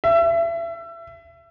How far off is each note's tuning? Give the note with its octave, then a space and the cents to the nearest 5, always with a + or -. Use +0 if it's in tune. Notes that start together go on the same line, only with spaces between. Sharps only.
E5 +30